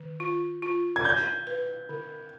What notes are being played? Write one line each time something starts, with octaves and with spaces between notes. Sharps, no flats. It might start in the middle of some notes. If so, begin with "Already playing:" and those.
Already playing: D#3
F4
F4
G#6
D5 G6
B4
D3